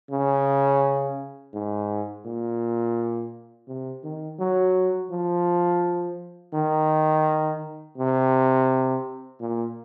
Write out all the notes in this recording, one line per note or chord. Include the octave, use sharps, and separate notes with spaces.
C#3
G#2
A#2
C3
D#3
F#3
F3
D#3
C3
A#2